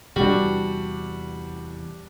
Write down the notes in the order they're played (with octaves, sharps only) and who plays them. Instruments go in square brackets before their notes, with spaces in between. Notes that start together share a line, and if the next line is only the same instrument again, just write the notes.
[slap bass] E2 C3 E3 [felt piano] G3 D4 [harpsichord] F#4